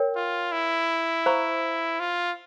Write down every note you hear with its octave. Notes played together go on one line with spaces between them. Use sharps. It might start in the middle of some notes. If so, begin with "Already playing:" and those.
Already playing: A#4 C#5 G5
F4
E4
C5 F5 A#5 C#6
F4